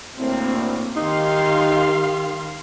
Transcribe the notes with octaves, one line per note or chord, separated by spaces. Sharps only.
D2 A2 A#3 C4
D#3 D#4 G4 F5 C6